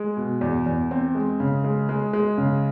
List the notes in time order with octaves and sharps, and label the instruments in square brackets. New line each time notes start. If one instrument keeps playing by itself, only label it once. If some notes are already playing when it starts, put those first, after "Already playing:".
Already playing: [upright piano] G#3
B2
E2
E2
C4
G#3
C#3
G#3
G#3
G#3
C#3